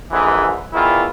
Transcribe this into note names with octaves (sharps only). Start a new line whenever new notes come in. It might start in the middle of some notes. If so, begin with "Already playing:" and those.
A#1 G#2 D3 E3
E2 D#3 E3 E4 F4